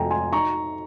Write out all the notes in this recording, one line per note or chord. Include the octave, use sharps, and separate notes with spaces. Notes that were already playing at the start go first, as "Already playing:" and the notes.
Already playing: F2 C3 G5 G#5 A#5
G#5 C6
D#4 A#5 C#6